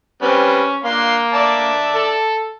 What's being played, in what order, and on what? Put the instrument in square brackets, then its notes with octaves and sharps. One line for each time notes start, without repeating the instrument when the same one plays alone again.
[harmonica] G3 C4 B4 [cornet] C#4
[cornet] A#3 [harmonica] D4 F5 C6
[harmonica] D5 E5 A5
[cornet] A4